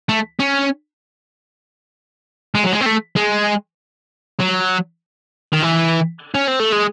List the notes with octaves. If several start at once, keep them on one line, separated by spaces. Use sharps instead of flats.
A3
C#4
G#3
F#3
G#3
C4
A3
G#3
F#3
D#3
E3
C#4
C4
A3
G#3